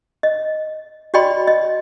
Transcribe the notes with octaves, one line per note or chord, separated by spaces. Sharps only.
D#5
F#4 D5 D#5 G5 B5 C6
D#5